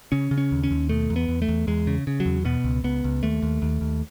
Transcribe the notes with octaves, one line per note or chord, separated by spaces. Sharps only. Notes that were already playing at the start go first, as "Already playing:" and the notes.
C#3 C#4
C#3
C#4
D#2
C#4
D#2
B2 A3
E2
B3
E2
A3
E2
E2 G#3
C#3
C#3
F#3
E2
B2 B3
C#2
C#2 B3
C#2
D#2 A3
D#2
D#2
D#2